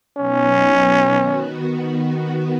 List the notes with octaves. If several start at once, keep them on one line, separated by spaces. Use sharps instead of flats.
B2 F#3 B3 C#4 D#4
D#3 B3 F#4